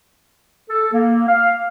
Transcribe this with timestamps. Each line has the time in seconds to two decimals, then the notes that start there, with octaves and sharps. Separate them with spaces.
0.70 A4
0.93 A#3
1.27 F5